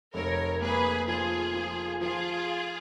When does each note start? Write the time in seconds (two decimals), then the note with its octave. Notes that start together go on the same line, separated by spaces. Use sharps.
0.14 F1 A#4 C#5
0.61 A#3 G#4 B4
1.07 F3 F4 G#4
1.54 F3
2.01 F3 F4 G#4